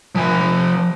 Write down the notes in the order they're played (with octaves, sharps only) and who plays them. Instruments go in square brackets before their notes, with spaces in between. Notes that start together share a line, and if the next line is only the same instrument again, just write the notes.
[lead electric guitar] F3 G#5